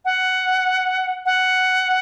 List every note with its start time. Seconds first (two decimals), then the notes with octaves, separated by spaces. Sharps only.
0.05 F#5
1.26 F#5